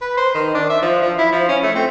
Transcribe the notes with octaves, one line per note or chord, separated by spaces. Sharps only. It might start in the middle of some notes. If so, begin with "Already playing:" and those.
B4
C5
D#3
D4
E5
F3
F3
E4
F3
C#4
A3
C4